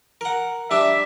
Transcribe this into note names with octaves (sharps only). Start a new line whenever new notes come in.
A#4 F#5
G3 D4 E5